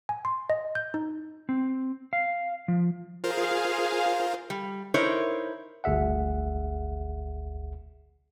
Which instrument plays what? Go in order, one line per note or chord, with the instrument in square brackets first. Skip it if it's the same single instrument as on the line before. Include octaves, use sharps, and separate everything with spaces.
[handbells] G#5
C6
D#5
G6
D#4
[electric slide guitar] C4
F5
F3
[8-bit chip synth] F4 A#4 C5 [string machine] G#4 F5
[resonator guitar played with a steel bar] G3
D#4 E4 A#4 C5 C#5
[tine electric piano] G1 D2 G#4 E5 F#5